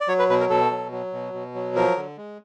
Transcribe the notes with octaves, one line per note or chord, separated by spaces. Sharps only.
D5
F#3 C#5
B4
B2 B4
A#4
B2 A4
F#3
F#3
B2
B2
F#3
F3 A#4
D3
G#3